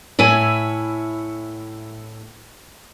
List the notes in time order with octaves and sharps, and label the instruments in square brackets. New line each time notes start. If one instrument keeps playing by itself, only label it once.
[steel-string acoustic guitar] A2 E4 C#5 G#5